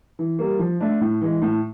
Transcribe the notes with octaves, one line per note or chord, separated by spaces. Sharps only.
E3
G3 A#3
F3
A3 D4
A2
E3 G#3
A2